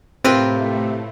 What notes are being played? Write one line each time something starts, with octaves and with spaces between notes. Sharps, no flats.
A2 C3 A3 C4 F4 A#4 B4